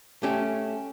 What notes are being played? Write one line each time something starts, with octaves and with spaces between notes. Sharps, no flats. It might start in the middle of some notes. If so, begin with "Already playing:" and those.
A3 C#4 G4